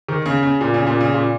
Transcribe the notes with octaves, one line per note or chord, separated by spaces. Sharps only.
D#3
C#3
C#3
A#2
C#3
A#2
C#3
A#2